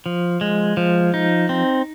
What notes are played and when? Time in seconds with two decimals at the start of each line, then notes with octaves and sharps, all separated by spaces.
0.06 F3
0.41 G#3
0.77 F3
1.14 D#4
1.49 C4